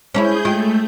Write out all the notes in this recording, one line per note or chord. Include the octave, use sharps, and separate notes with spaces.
G#3 C#4 D#4 E4 G#4 G6
G#3 A3 F4 G5